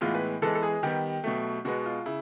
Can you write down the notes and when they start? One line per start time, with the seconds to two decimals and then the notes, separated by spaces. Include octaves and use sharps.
0.01 A2 E3 G#3 B3 F4
0.15 B4
0.42 E3 G#3 B3 A4
0.55 A4
0.63 G#4
0.83 D#3 G3 B3 G4
1.24 B2 F#3 A3
1.65 B2 G#3 B3 F#4
1.85 F4
2.06 C#3 E4